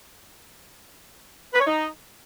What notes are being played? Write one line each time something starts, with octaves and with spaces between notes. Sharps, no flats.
B4
C#5
D#4